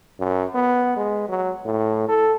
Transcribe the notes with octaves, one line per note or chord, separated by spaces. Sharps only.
F#2
B3
G#3
F#3
A2
A4